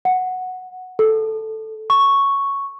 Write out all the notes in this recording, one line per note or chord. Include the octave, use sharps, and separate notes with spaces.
F#5
A4
C#6